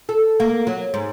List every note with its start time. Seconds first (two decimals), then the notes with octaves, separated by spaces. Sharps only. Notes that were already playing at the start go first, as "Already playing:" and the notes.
0.09 A4
0.40 A#3
0.67 F#3
0.94 G#2